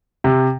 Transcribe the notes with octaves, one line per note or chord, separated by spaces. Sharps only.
C3